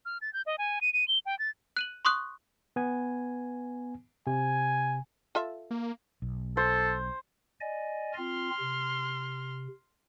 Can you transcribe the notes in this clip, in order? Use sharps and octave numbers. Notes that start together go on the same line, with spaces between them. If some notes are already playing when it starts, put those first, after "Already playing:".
F6
A6
G6
D#5
G#5
D#7
D#7
G7
G5
A6
F#6 D#7 F#7
C6 C#6 D#6 F#6
B3 G#5
C3 G#5
F4 A4 E5
A#3
B1
A4 C5
D5 D#5 G#5
C4 F4 C6 F6
C3